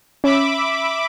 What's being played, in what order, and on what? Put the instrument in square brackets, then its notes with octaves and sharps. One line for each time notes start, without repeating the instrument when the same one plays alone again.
[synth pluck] C#4 [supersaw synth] E5 B5 D6